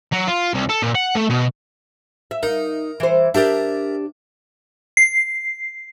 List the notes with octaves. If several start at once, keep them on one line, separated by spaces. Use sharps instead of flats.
F#3
F4
C2
A4
A#2
F#5
A3
B2
E5
D#4 A#4
E3 C5
D4 G4 A#4 E5
C7